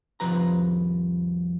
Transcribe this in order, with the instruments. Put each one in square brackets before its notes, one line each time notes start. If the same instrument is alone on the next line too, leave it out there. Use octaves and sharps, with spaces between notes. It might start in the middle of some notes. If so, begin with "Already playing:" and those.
[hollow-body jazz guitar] C2 F2 F3 B4 A#5